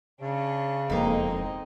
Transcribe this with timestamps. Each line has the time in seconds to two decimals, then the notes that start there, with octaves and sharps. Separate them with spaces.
0.20 C#3 C#4 D4
0.90 E1 F2 G#3 A#3 C4 D#4